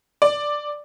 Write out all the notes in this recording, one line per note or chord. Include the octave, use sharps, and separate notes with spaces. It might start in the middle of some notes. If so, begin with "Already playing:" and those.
D5